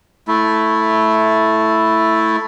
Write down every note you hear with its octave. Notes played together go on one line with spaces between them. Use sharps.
A3 E4